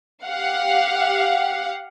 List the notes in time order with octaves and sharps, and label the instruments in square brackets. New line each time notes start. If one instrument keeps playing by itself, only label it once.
[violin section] G4 F5 F#5